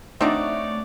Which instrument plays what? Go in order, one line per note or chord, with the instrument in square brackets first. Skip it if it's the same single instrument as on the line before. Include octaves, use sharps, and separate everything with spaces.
[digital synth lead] A3 [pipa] C4 D4 F#4 [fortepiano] D#4 [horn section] C#5 D5